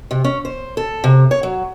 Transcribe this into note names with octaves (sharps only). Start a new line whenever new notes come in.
C3
C#4
C5
A4
C3
C#5
F#3